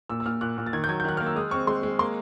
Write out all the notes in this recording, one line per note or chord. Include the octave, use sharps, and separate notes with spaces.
A#2 E6
E6
A#2 F6
A#2 F#6
A#2
A6
D#3 G#6
G6
F#3 G#6
G6
D#3 F#6
A#3 F6
E6
G#3 D#6
C4 C#6
G#3 C6
G#3
A#3 C6